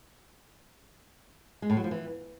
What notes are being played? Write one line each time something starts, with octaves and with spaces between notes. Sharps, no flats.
G#3
A2
F#3
F3
E3